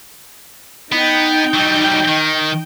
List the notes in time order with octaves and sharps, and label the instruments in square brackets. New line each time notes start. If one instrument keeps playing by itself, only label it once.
[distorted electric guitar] B3 [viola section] D#4 G5
[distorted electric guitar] F#3 G3
D#3